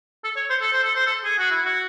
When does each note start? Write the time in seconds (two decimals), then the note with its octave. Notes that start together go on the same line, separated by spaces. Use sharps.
0.24 A4
0.36 C#5
0.50 C5
0.62 A4
0.72 C5
0.84 A4
0.95 C5
1.06 A4
1.24 G#4
1.38 F#4
1.51 E4
1.65 F#4